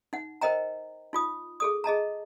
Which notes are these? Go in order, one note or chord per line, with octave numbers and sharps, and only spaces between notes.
D#4 F#5
A#4 C5 D#5 G5 A#5
D#4 F4 D#6
G#4 A4 D#6
G#4 D#5 A5 A#5